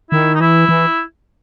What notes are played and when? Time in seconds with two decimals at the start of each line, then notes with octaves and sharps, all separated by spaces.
0.11 D#3 E4
0.35 D#4
0.40 E3 E4
0.69 E3